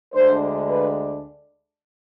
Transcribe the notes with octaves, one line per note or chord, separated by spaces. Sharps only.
D2 D3 G#3 D4 C5
B4